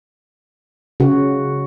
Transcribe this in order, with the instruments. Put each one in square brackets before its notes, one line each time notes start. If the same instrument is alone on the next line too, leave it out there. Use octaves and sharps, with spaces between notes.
[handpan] C#3 F#4